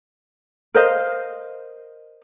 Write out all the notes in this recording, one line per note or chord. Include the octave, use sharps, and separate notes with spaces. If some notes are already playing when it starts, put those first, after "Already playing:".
A#4 C5 D#5 F5